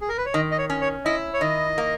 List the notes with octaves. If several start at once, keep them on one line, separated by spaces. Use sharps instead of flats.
G#4
A#4
B4
C#5
D#3 D#5
D#5
C#5
C#4
C#5
E4 D#5
C#5
D#3 D#5
A#3